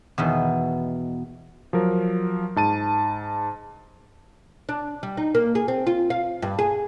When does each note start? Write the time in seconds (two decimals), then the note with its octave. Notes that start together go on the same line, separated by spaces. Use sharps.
0.18 E2 B2 D#3
1.73 F3 F#3 A#4
2.56 G#2 A5 D#7
4.69 D4
5.03 G3
5.17 D#4
5.35 A#3
5.55 G#4
5.68 C4
5.87 F4
6.10 F5
6.42 G2
6.59 G#4